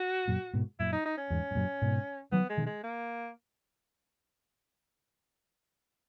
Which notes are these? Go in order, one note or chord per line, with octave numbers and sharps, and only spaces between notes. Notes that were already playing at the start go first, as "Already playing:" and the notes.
Already playing: F#4
F#2 A#2
G#2 B2
F#2 A#2 E4
D#4
D#4
C#4
E2 G#2
G#2
F#2 A#2
G#2 B2
D#3 F#3 B3
G#3
B2 D#3
G#3
A#3